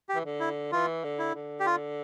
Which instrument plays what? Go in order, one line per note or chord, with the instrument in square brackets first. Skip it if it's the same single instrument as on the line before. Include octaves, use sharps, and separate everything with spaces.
[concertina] G4
[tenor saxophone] E3
D3
[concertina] E4
[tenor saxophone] E3 [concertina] F4
[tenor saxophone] D3
[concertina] E4
[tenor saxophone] D3
[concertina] G4
F4